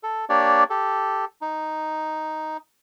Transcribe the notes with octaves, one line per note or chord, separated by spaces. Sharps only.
A4
A#3 D4 G4 C#5 D5
G4 A4
D#4